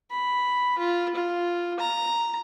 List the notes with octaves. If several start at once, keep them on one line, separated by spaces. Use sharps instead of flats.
B5
F4
F4
A#5